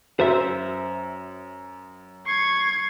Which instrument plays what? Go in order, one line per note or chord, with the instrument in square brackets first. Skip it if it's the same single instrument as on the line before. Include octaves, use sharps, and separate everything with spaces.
[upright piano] F#2 [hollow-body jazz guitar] C5 E5
[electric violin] C#6 G#6 [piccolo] C7